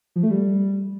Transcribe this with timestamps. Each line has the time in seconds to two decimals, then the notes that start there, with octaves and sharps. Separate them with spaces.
0.16 F3
0.23 A3
0.31 G3